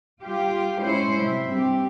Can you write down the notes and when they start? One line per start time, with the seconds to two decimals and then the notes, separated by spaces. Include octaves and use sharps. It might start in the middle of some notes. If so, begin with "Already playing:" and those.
0.23 G3 F4 G4
0.80 G#3 C#4 E4 C5 C#5
1.21 C3 F#3 E5
1.52 G2 C4 G4